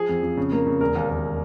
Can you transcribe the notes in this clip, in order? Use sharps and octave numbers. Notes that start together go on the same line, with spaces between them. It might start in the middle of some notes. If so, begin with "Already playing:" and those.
Already playing: F3 G#4
F2
F2
C#3
A#3
C#3
E1 A#4
D#2
D#2